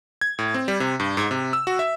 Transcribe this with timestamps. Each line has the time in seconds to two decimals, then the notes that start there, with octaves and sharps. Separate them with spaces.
0.21 G#6
0.39 A2
0.54 C4
0.68 G3
0.80 C3
1.00 G2
1.17 G#2
1.31 C3
1.53 E6
1.67 F#4
1.79 E5